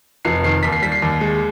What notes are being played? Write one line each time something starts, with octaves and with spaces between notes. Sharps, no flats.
F1 C7
D#3 C7
D#2 B6
C7
G3 B6
C7
D#2
G#3